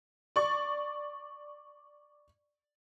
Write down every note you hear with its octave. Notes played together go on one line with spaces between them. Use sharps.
D5 C#6